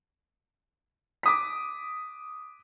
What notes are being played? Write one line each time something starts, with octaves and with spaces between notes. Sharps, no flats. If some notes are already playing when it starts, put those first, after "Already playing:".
D6 D#6 B6